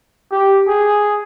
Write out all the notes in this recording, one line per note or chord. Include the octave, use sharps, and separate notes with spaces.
G4
G#4